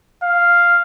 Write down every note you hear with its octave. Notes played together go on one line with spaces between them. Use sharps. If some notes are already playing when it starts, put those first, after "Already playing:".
F5